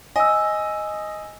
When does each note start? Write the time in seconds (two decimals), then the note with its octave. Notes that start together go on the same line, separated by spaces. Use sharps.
0.16 D#5 G#5 E6